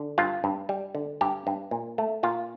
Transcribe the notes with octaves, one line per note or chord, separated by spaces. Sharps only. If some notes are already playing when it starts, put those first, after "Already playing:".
Already playing: D3
G2 F4
G2
G3
D3
G2 G4
G2
A#2
A3
A#2 F4